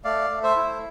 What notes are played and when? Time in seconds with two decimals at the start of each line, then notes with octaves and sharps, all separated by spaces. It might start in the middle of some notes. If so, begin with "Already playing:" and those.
0.04 A3 D5 F5
0.30 A3
0.43 C5 E5
0.56 E4